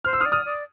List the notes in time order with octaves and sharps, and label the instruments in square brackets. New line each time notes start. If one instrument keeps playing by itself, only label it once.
[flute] C5 [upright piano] F6
[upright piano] E6
D#6 F6
[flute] D5
[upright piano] D#6 F6
[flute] D5